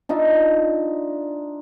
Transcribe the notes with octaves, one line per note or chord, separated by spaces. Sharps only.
D4 D#4 F4 E5